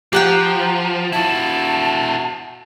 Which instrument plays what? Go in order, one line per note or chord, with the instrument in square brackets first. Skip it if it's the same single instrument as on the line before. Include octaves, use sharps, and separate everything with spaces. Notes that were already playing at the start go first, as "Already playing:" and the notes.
[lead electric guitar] F3 [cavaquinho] G4 F#5 G5 [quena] A#5
[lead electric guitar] E4 F#4 [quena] A5